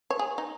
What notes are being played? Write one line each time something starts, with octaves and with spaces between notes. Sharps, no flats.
C#5
G#4
D#4